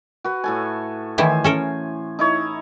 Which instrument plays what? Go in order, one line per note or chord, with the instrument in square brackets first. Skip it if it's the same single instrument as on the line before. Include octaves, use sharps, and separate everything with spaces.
[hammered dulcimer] F#4 B4
A2 A4 G#5
[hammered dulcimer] A2 C5 G#5 [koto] D#3 E3 E4
[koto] C#4 A4 A#4
[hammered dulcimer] D#4 E4 C#5